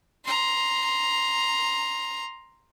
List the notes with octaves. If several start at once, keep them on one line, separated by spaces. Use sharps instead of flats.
A#5 C6